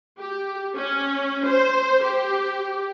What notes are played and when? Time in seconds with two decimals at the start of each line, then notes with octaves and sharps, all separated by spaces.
0.19 G4
0.75 C#4
1.46 C5
2.03 G4